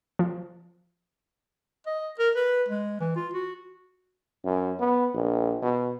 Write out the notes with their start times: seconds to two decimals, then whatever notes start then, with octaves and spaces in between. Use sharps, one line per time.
0.19 F3
1.87 D#5
2.19 A#4
2.36 B4
2.68 G#3
3.00 E3
3.16 F4
3.33 F#4
4.44 F#2
4.80 B3
5.15 A#1
5.62 B2